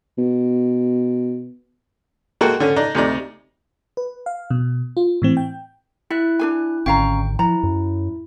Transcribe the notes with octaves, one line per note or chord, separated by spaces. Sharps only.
B2
G#3 A#3 F#4 A4 F#5 G5
D3 C#4
D4 D#4
D2 C3 D#4 D5
B4
F5
B2
F4
A2 E3 C4
G5
E4 E5 F#6
D4 G#4 G#5
G#1 D3 C#4 F5 G5 A#5
F3 E4 A#5
F#2